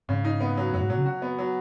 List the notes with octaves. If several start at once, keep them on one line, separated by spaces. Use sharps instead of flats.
G#2 C#3
D#4
B3
F#3
F#2 F#3
G#2
A#2 F#3
C#3
F#4
B3
F#3